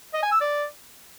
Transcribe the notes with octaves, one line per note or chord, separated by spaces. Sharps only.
D#5
G#5
E6
D5